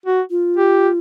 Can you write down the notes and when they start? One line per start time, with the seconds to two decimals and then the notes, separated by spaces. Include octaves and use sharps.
0.06 F#4
0.30 F4
0.57 G4